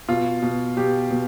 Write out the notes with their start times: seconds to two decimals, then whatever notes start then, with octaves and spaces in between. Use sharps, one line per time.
0.08 B2 F4
0.43 B2
0.77 B2 G4
1.11 B2